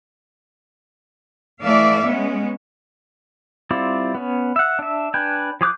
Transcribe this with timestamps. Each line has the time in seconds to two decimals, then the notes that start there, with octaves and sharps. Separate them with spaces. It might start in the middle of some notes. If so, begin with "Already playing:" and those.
1.62 E3 A3 D5 E5 F5
2.05 G#3 B3 C#4
3.71 G3 C4 E4 F4 D5
4.15 B3 C#4
4.56 E5 F#5
4.79 D4 E5
5.14 D4 B4 G5 G#5
5.61 F3 G#4 D6 F#6 G6